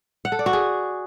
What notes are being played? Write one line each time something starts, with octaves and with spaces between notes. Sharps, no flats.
F#5
A4
D5
F#4
G#4